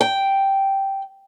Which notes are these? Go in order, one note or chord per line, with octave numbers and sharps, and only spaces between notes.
G5